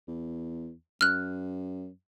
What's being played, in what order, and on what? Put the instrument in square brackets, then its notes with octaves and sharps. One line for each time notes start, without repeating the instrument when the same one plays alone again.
[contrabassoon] E2
[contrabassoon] F#2 [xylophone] F6 F#6